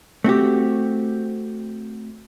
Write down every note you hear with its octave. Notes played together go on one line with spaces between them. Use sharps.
A3 C4 F#4 G4